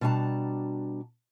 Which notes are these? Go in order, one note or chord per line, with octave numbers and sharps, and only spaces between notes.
B2 G3 D4 F#4 A5 A#5